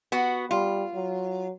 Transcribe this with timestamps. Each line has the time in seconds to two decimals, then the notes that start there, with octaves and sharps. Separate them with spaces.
0.12 B3 F#4
0.51 G3 F4
0.94 F#3